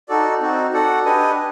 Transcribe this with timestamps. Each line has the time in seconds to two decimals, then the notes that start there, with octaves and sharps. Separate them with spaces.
0.09 D#4 F#4 A4 D5
0.41 C4 D#4 F#4
0.73 F#4 A4 D5 F#5
1.05 D4 G4 B4 D#5 G#5